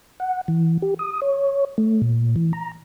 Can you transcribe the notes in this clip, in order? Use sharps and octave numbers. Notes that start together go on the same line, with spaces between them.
F#5
E3
G4
D#6
C#5
A3
A#2
E3
A#5